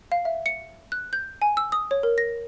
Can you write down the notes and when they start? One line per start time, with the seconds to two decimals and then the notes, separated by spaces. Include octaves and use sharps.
0.12 F5
0.25 E5
0.46 C#7
0.92 F#6
1.13 G6
1.42 G#5
1.57 E6
1.72 D#6
1.91 C#5
2.03 A#4
2.18 A#6